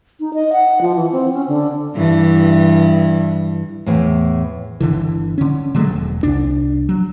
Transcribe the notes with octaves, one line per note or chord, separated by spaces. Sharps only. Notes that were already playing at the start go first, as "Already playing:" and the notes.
D#4
D#5
F#5
F3
E3
C4
C#4
D3
G2 E3
E2 A2
G1 D3 E3
D3 C#4
D3 F#3 G#3 A3
E1
C2 D4
F#3